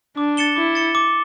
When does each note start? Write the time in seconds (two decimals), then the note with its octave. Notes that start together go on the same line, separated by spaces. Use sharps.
0.17 D4 D6
0.37 A6 C#7 E7 G7
0.56 E4 D6
0.75 A6 C#7 E7 G7
0.95 D6